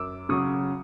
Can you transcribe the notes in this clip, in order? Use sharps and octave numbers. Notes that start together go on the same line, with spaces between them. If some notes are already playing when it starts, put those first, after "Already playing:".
Already playing: F#2 D6 E6
C#3 F#3 C#6 D#6